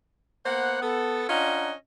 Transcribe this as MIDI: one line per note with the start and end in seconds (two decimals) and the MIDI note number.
0.45 0.81 58
0.45 0.81 59
0.45 0.81 72
0.45 0.81 78
0.82 1.24 59
0.82 1.24 69
1.29 1.72 61
1.29 1.72 62
1.29 1.72 65
1.29 1.72 75
1.29 1.72 78
1.29 1.72 82